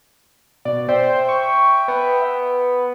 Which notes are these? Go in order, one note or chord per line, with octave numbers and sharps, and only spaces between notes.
B2 D5
C5 E5 G5
C#6
B3